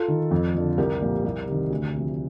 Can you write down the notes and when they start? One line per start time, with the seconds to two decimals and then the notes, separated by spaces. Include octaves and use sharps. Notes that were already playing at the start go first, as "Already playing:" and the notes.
Already playing: F4 A4
0.08 D#3
0.31 F2
0.55 D3 F3
0.78 C2 G4 A#4
1.01 A#2 F3
1.24 C2
1.47 C3 D#3
1.70 D2
1.94 C3 F3